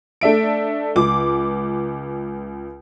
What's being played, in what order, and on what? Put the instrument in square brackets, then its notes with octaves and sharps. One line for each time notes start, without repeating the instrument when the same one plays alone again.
[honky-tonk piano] A3 D4 E5 D7
C#2 D6